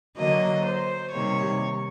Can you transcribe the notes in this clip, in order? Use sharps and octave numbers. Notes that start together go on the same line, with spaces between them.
D3 F#3 A#3 D#5
C5
C3 D#3 G3 A#3 C#5